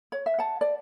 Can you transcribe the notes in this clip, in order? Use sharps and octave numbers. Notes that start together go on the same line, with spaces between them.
C#5
E5
F#5 A5
D5